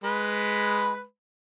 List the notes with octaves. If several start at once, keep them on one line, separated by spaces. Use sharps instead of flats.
G#3 B4 B5